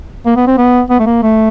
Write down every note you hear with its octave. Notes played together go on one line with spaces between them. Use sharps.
A#3
B3
C4
B3
B3
A3
A#3
A3